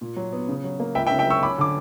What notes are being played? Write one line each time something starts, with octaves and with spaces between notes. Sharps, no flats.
A#2
F#3
B3
C#3
F#3
A#3
C#2 E5 G5
E5 G5
C#3
E5 G5
F#3 C#6 E6
C#4 B5 D6
D3 D6